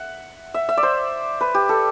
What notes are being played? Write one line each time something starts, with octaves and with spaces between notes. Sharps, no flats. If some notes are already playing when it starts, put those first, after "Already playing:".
Already playing: E5 F#5
E5
E5
D5
C5
B4
G4
A4